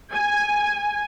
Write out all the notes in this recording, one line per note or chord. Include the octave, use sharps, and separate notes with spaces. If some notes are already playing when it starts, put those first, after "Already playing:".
G#5